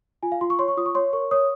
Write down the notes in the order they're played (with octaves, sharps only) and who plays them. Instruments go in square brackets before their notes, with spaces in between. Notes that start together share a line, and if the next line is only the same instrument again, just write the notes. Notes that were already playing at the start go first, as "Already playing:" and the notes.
[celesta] F4 G#5
F5
F4 C6
C#6
C#5 C6
C#6
F4 D#6
C#6
C#5 C6
A#4 C#6
C#5 D#6